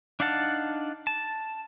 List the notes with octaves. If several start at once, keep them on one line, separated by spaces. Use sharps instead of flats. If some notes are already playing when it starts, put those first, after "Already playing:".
D4 D#4 F5 F#5 A5
A5